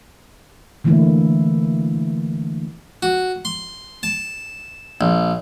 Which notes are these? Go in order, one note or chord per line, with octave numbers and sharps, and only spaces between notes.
D3 E3 A3 A#3 E4
F#4
C6
A5
A#1